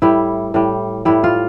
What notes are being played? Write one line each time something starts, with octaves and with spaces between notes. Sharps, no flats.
A2 G3 E4
A2 G3
A2 G3 E4
F4